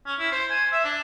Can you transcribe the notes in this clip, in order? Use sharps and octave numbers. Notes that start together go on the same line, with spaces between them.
C#4
E4
C5
G#5
E5
D4